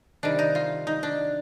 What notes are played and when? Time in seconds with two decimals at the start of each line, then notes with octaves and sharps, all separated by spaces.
0.23 C3 D#3 G3 D4
0.39 D#4
0.55 F4
0.87 D#4
1.03 D4